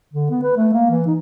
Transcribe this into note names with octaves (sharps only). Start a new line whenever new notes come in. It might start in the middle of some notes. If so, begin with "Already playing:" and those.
D3
B3
B4
A3
A#3
E3
D#4